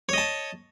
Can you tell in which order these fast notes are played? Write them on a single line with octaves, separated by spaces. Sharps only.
C#5 D#5 A5